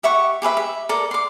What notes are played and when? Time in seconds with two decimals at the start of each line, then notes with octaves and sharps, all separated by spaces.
0.03 G4 E5 F#5 C#6
0.42 G4 G#4 B4 E5
0.57 E5
0.89 A4 A#4 D5
1.11 C6 D6